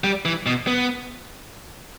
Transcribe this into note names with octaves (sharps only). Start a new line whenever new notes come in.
G3
E3
B2
B3